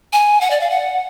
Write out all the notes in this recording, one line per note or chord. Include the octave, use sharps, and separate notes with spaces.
G#5
F#5
D5
F5
F#5